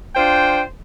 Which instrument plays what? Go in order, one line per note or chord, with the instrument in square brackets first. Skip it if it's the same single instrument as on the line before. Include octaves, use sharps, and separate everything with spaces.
[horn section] D4 F4 C5 G5